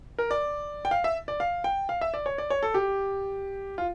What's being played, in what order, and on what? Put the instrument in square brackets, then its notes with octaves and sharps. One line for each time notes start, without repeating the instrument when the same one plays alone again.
[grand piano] A#4
D5
G5
F5
E5
D5
F5
G5
F5
E5
D5
C#5
D5
C#5
A4
G4
F4